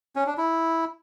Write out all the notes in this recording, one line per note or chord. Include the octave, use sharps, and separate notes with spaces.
C#4
D4
E4